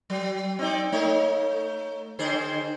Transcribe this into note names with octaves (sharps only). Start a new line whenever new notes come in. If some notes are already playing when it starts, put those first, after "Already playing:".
F#3
C4 D#4 D5
A3 D#4 C#5
D3 G#4 C5